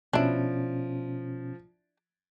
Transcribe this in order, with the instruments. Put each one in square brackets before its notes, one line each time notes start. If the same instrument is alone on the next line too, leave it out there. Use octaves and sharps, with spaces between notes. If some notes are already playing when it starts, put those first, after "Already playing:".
[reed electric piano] B2 C#4 [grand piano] F3 D7 [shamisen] D4 E4